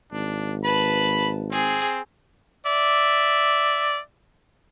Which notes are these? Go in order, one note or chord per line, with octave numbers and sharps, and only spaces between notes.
G#1 D4
B4 A5 B5
C4 G#4
D5 E5